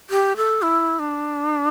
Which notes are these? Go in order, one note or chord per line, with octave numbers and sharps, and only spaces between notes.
G4
A4
E4
D4